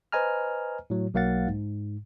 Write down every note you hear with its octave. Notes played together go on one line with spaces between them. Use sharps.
B4 C5 D#5 G#5 A#5 F6
A2 F#3
B1 F#3 A#3 F5 F#5 A6
G#2